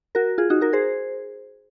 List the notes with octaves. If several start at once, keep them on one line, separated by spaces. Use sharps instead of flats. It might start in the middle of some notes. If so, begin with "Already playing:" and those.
F#4 A#4
F4 G#4
D#4 F#4
F#4 A#4
G#4 C5